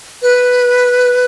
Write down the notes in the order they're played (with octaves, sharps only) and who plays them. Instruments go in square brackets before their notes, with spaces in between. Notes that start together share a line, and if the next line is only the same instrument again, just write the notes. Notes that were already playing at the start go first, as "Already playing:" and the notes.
[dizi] B4